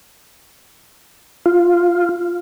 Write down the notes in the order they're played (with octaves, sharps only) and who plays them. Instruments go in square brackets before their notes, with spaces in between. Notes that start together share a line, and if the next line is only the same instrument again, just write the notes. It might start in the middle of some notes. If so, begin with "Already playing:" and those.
[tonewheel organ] F4